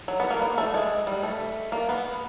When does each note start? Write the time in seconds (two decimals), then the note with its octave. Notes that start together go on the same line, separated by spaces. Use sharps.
0.08 F#3
0.20 B3
0.30 A#3
0.42 A#3
0.58 A3
0.74 G#3
1.07 G3
1.23 A3
1.72 A#3
1.89 B3